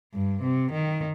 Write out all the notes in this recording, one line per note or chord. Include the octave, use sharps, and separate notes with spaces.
G2
C3
D#3